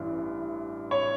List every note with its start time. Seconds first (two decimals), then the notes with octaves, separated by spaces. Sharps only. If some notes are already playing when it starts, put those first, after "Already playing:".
Already playing: A1 G2 E3
0.91 C#5